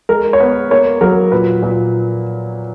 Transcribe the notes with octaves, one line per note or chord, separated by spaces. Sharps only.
G#3 A#4
C#5
B3 B4
A#3 C#5
F#3 A#4
A#2 B4
A#2